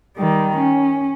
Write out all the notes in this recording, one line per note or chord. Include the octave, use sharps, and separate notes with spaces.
D#3 G3
C#4